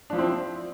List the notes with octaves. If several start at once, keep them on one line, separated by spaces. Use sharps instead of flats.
F3 C4 D4 E4